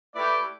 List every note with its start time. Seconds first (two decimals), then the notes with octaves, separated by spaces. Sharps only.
0.14 A3 E4 G4 B4 D5